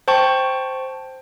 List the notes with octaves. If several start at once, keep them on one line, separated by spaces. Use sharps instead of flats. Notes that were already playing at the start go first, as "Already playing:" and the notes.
C5 G5 A5 C#6